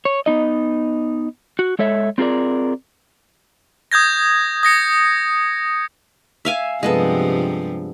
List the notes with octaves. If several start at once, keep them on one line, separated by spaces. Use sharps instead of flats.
C#5
B3 D#4 D#5
F#4
G#3 A4 C#5 E5
C4 F4 G#4 A#4 D5
D#6 G6 G#6 A#6
D#6 A#6 C#7
E5 F5 G#5
G2 C3 F3 G#3 B3 A4